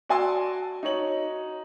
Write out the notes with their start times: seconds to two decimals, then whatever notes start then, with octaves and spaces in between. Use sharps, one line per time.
0.09 F#4 D5 G#5 A5 C6 E6
0.83 D#4 F#4 C#5 F#7